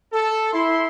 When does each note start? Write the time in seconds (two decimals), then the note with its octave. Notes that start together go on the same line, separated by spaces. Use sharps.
0.13 A4
0.53 E4 C6